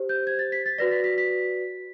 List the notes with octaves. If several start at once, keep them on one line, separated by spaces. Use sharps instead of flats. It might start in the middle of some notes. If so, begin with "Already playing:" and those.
Already playing: G4 C5
G6
G#6
A6
B6
A6
F#4 B4 D5 A#6
B6
B6
B6